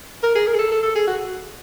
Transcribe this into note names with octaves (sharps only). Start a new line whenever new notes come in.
A#4
G#4
A#4
G#4
A4
A4
A4
G#4
F#4